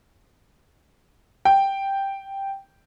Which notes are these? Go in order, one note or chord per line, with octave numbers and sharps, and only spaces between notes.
G5